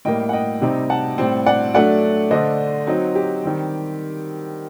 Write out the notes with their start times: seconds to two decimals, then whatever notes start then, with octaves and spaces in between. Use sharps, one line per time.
0.05 A2 G3 A#3 D#5 G5
0.29 F#5
0.33 D#5 G5
0.61 C3 G3 C4 D#4
0.90 F#5 A5
1.18 A2 G3 C4
1.46 D5 F#5
1.74 F#3 A3 D4 D5 F#5
2.31 D3 A3 D4 C5 D#5
2.87 F#3 C4 D#4
3.15 G4
3.44 D#3 G3 C4